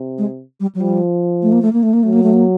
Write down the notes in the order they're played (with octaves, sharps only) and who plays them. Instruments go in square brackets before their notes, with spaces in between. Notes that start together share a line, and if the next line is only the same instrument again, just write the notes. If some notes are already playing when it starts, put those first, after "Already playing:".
Already playing: [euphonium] C3
[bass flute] G#3
G3
F#3
[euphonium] F3 [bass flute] G3
[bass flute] A3
A#3
A3
A#3
A3
A#3
[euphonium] F#3 [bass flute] A3
[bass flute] A#3
A3
A#3